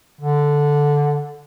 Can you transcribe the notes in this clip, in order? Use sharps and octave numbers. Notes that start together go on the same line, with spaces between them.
D3